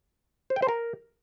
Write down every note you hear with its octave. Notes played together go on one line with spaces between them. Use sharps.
C5
G5
C5
A#4